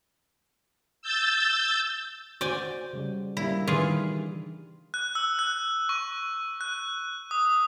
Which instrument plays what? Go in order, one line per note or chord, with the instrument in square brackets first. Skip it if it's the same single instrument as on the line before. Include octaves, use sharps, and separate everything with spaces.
[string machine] E6 G6 A6
[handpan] F#4 C5 [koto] D5 G5 G#5
[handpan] C#3 G3
[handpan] G3 A#3 D4 [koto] E4
[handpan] D#3 G3 [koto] E3 F4 G#4
[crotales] F#6
E6
F#6
C#6
F#6
D#6